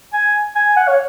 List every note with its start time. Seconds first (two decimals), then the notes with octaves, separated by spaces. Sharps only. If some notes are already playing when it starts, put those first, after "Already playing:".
0.13 G#5
0.56 G#5
0.76 F#5
0.88 C#5